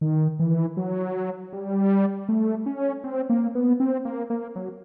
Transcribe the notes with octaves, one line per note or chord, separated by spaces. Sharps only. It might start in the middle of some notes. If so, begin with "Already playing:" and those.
D#3
E3
F#3
G3
A3
C#4
C4
A#3
B3
C4
A#3
A#3
F#3